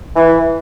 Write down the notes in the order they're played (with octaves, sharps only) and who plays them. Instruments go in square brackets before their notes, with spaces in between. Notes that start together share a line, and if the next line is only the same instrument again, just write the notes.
[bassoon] E3